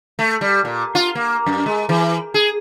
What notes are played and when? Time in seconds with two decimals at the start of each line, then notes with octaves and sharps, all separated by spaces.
0.19 A3
0.41 G3
0.65 A#2
0.95 F4
1.15 A#3
1.46 F#2
1.66 G#3
1.89 E3
2.34 G#4